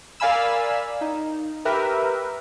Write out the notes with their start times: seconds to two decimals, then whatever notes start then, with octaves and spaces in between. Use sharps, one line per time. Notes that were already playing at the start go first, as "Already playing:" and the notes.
0.20 A#4 D5 F5 G#5 B5 E6
1.01 D#4
1.65 G4 A#4 B4 E5